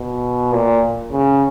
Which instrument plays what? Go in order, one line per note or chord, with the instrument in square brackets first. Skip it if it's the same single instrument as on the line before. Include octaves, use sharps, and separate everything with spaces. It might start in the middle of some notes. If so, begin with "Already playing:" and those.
Already playing: [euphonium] B2
A#2
C#3